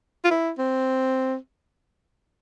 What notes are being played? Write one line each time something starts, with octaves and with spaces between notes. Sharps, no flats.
F4
E4
C4